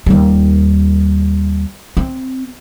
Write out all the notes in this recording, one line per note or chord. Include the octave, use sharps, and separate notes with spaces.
D#2 G3
C4